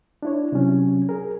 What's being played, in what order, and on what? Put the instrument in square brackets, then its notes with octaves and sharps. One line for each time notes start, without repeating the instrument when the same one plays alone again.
[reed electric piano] D4 E4 C#5
C3 F#3 C#4
G#4 A#4